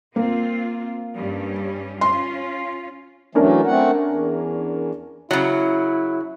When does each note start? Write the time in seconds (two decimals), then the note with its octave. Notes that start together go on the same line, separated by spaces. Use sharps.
0.16 A#3 C4 F4
1.15 G2 G3 C#4
2.01 C#4 F4 C6
3.35 E3 F#3 A3 C#4 D4 A#4
3.66 A3 C4 F#5
4.02 E2
5.31 C#3 F#3 E4